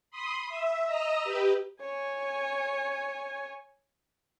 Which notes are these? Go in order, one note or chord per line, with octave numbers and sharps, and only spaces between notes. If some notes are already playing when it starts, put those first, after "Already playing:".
B5 C6 D#6
E5
D#5 A#5 D#6 E6
G4 B4
C#5 G#5